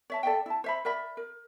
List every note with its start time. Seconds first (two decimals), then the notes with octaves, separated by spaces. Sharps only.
0.10 C#5 E5 A5
0.23 A4 D5 E5 G5
0.46 E4 A5
0.64 C5 E5 B5
0.85 A#4 D5 E5 B5
1.17 A#4